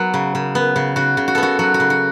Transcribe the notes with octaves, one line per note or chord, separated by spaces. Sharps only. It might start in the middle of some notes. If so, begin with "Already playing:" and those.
Already playing: F#3 B3 F#4
C#3
C#3
B3
C#3
C#3 F#4
C#3
F#4
B3 A4
F#4
F#3 F#4
F#4
C#3
F#4